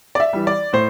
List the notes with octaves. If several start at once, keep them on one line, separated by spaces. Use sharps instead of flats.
D5
E5
E3 G3
D5
A2 C5